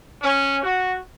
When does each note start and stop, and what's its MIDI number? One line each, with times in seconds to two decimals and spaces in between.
0.23 0.60 61
0.63 0.95 66